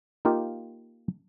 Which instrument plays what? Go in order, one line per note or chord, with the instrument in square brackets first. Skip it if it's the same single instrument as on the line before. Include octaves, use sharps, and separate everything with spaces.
[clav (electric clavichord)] A#3 D#4 F4 G4 A#4